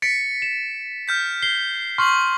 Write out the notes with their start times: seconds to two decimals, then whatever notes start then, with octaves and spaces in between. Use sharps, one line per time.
0.02 A6 B6 C#7 D7
0.42 E7
1.08 F6 G6 B6
1.42 C7 G7
1.98 C6 C#6 F6 C7 F#7